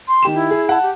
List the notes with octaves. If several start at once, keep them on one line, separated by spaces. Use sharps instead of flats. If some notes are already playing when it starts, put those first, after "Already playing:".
C6
D#3 G4 E7
E4
G#4
F#5 A5
G4